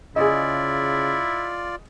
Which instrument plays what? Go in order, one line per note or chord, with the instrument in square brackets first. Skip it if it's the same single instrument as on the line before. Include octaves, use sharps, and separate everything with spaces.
[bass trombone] C#3 [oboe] E4 [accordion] F4 D5 [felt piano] G#4 D#5